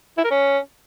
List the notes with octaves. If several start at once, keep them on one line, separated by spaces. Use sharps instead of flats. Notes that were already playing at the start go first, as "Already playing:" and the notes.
E4
A#4
C#4